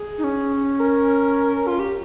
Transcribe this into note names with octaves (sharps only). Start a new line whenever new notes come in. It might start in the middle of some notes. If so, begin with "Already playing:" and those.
Already playing: G#4
D#4
C#4
A#4
F4
G4